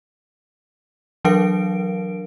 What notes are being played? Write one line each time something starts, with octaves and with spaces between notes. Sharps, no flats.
E3 F#3 D4 A#4 F5 D7